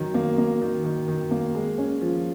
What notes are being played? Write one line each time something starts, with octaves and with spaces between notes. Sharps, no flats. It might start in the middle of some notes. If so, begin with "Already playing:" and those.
Already playing: D#3 F#3
A#3
A#3
D#3
D#3
D#3
A#3
G#3
C#4
F3